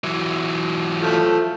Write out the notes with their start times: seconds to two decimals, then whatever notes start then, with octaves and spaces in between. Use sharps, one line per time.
0.04 E3 F#3
1.00 F3 A3